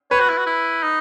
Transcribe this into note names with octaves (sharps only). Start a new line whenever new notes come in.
B4 C#5
F#4
E4
F#4
E4
D#4